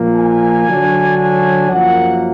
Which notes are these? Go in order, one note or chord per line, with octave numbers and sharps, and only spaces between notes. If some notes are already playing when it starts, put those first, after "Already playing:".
Already playing: A#2 F3 A#3
G#5
D3 F#3 D4
G#5
F#2 F3 A#3 F#5